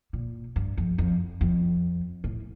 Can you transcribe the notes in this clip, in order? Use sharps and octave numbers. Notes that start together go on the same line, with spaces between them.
A#2
G2
F2
F2
F2
A2